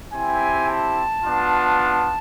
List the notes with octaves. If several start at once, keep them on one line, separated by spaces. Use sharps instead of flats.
C4 E4 G4 G#5
A5
B3 D4 F4